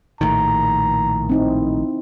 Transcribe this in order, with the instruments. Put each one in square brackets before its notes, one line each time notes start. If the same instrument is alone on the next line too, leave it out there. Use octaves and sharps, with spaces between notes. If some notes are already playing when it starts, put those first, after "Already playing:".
[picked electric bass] A#1 A2 D#3 [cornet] A#5
[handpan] C4 D#4 E4